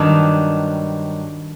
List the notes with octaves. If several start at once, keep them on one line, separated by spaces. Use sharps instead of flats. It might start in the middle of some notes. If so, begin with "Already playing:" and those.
Already playing: G2 D#3 F#3 D4